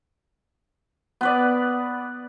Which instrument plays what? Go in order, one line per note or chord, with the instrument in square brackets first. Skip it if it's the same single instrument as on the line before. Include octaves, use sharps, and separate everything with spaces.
[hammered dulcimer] B3 B4 D5